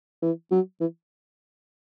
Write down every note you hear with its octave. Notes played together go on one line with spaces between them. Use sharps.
E3
F#3
E3